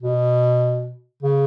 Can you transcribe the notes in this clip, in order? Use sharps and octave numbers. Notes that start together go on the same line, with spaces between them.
B2
C#3